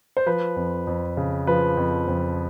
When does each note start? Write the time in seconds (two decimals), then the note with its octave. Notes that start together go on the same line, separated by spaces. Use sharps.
0.17 C5
0.26 F3 B4
0.56 F2
0.87 F2
1.17 C#3
1.47 F3 B4
1.77 F2
2.08 F2